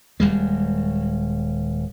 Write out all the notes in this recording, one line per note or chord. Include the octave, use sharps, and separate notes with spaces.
D#1 G3 G#3